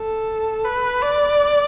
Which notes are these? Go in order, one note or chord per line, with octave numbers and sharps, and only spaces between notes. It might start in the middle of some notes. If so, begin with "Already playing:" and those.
Already playing: A4
B4
D5